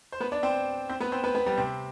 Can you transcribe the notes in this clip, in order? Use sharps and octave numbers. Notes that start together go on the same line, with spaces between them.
C5
B3 B4
D4 D5
C4 C5
C4 C5
B3 B4
C4 C5
B3 B4
B3 B4
G3 G4
C3 C4